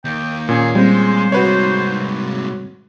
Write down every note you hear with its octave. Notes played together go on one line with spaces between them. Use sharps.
D#2 G5
A#2 C#4 G#4
G3 G#3 C4 C5
G#2 C3 F#4 B4 C#5